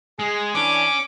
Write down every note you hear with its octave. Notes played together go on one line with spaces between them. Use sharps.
G#3 G#4
E3 C#4 D4 D6